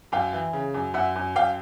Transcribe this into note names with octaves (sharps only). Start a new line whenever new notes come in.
F#2 F5 G5
E3
C#3
F#2
F#2 E5 F#5
F#2
F#2 F5 G5